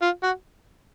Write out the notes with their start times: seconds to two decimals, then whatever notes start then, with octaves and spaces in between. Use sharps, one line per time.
0.02 F4
0.23 F#4